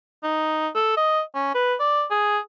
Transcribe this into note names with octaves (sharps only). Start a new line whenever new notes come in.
D#4
A4
D#5
C#4
B4
D5
G#4